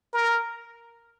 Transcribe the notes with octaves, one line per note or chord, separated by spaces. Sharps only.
A#4